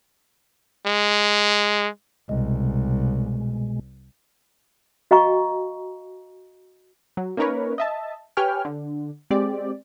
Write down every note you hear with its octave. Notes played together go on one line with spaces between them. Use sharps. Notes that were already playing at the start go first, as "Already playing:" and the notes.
G#3
C2 B2 G#3
F#4 D#5 F5 G5 A#5 C#6
F#3
A#3 C#4 D#4 A#4 B4 C#5
D#5 E5 A5
G4 B4 C#5 G5 G#5 F6
D3
G#3 C4 G4 D5